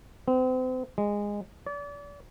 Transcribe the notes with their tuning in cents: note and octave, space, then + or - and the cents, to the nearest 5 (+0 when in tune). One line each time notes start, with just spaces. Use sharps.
C4 -35
G#3 -15
D5 -35